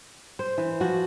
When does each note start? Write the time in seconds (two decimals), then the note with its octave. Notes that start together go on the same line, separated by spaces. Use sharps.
0.39 C5
0.58 E3
0.80 F3 F#4